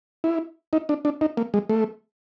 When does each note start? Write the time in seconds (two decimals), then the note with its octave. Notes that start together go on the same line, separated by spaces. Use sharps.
0.24 E4
0.73 D#4
0.89 D4
1.05 D4
1.21 D#4
1.37 A#3
1.54 G#3
1.70 A3